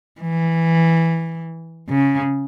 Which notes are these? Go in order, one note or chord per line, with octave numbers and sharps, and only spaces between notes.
E3
C#3